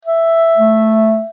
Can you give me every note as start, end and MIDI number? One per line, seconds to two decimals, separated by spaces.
0.05 1.30 76
0.57 1.20 57